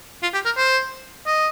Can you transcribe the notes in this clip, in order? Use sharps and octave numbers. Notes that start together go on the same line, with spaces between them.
F4
G4
A#4
C5
D#5